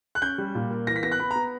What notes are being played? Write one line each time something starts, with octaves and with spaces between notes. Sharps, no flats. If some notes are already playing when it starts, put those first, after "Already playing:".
F#6
C#4 G6
G3
A#2
A#3
E3 A#6
B6
B3 A#6
F#6
B3 B5
B3 A#5